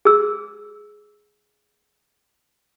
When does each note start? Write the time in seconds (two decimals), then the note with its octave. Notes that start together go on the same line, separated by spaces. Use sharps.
0.05 G#4 E6